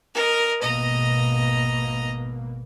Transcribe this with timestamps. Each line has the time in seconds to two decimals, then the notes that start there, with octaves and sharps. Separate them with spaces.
0.15 A#4 D#5
0.63 G#1 B2 A#3 D#5 A#5